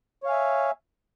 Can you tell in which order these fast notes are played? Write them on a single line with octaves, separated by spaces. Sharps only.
C#5 F5 G#5 E5